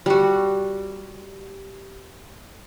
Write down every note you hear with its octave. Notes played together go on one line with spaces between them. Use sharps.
G3 F#4